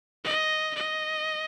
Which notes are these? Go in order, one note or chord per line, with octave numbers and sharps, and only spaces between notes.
D#5
D#5